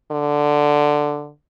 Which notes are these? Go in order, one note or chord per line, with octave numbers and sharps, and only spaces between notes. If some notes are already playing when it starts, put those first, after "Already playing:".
D3